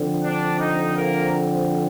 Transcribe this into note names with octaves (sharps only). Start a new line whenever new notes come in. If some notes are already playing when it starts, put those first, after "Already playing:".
Already playing: D3 F3 C4
D4
D#4
A#3 A#4